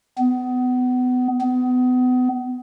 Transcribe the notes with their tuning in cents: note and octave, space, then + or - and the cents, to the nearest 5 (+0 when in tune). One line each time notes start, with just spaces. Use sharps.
B3 +25
B3 +30